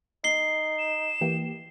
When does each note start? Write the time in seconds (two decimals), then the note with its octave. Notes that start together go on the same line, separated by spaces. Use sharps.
0.24 D#4 C7 G7
0.79 E7
1.21 E3 A#3 G4